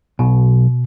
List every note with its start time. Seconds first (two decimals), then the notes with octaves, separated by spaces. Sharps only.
0.19 B1 B2